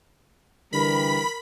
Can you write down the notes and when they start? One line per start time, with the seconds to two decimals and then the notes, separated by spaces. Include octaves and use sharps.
0.73 D3 E3 G3 A#4 B5 B6